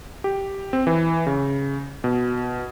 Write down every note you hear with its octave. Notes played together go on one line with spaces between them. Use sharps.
G4
C4
E3
C#3
B2